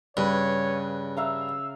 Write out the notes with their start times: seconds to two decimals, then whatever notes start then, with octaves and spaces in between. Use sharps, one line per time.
0.17 G2 C#3 B4 C#5
1.17 E5 F5 A#5 E6